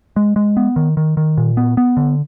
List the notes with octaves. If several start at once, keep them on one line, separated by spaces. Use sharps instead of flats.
G#3
G#3
B3
D#3
D#3
D#3
A#2
B3
B3
D3